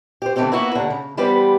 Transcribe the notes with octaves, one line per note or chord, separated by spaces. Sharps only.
G4 C5
D3 E3 F#3 A3 C4 G4
A#3 B3 E4 F#4
D#2 D3 F#5
C#3
E3 G3 B3 G4 B4 C5